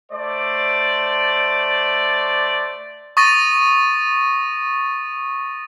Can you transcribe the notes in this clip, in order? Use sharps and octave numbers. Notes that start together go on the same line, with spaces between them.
A3 C5 D5
C#6 D#6 A6 A#6 D#7